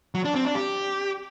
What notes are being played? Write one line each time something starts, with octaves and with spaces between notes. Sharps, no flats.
F#3
D4
C4
D4
G4